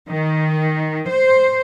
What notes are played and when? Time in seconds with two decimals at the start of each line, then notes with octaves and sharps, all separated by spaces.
0.11 D#3
1.10 C5